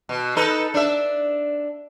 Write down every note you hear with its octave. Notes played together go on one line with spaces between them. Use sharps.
B2
D#4 A4 B4
D4 E5